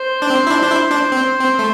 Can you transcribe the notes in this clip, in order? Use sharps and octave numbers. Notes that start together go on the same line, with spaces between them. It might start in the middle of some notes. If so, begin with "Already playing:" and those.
Already playing: C5
D4
C4
E4
D4
D4
E4
D4
C4
C4
A3